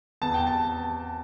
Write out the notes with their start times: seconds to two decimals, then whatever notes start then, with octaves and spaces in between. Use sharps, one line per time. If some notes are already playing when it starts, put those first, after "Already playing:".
0.22 E2 A5
0.34 G5
0.47 A5